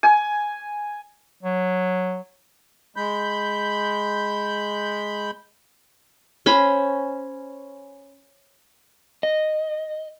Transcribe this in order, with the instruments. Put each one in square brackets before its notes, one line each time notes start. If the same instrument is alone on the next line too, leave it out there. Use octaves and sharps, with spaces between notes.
[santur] G#5
[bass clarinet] F#3
[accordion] G#3 B5 G6
[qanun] C#4 C5 B5
[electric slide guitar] D#5